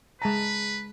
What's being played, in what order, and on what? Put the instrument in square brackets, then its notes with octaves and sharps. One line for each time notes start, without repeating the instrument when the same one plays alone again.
[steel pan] G#3 A5 A#5 [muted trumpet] B4